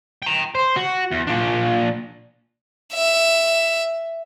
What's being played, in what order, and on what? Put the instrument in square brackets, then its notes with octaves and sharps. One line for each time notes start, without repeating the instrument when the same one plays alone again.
[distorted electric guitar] G5 A#5
C5
F#4
E2
A#2 D4
[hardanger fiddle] E5